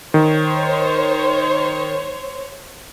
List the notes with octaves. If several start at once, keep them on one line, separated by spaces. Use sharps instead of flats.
D#3 C5 C#5